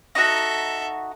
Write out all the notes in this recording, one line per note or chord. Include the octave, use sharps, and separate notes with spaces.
D#4 F#4 A4 E5